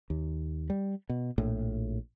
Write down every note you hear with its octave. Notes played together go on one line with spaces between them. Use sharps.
D#2
G3
B2
A#1 A2